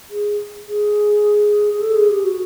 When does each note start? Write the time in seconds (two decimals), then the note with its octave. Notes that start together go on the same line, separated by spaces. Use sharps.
0.10 G#4
0.67 G#4
1.74 G#4
1.81 A4
1.96 G#4
2.10 G4
2.24 F#4